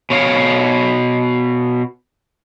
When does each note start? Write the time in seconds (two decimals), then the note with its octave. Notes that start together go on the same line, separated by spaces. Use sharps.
0.10 B2 C#5 F5